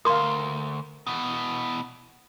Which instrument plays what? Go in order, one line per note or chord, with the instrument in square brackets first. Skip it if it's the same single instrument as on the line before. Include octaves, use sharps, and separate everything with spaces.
[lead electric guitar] D2 [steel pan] A#4 F5 [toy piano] C6 D#6
[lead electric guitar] B2 E3